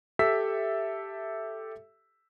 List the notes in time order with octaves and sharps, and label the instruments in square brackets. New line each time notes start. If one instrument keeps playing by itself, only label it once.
[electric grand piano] G4 A4 E5 E6 B6